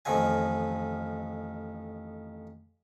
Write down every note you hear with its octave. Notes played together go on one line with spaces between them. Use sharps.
A1 F2 D#3 F3 G#5